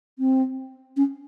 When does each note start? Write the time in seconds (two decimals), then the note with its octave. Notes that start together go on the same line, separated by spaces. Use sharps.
0.19 C4
0.97 C#4